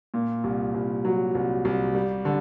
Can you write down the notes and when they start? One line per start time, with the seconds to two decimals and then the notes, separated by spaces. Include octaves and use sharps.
0.14 A#2
0.44 C2
0.74 C2
1.05 F#3
1.35 C2
1.65 C2
1.95 G3
2.25 D3